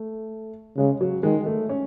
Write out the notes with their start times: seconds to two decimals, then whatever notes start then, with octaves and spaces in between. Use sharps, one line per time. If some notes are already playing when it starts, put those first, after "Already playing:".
Already playing: A3
0.77 C#3 G#3
1.01 F#3
1.23 D#3 G#3
1.46 A3
1.69 C#4